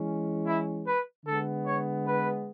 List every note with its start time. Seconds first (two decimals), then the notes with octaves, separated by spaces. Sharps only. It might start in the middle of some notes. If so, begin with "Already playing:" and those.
Already playing: E3 G#3 C#4
0.46 E4
0.86 B4
1.25 D3 G#3 B3 A4
1.66 C#5
2.05 B4